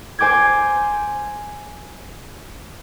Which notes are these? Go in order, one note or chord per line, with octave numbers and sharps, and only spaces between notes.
C5 G#5 D6 G6 G#6